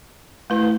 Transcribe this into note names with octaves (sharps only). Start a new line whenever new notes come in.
A3 E4 B4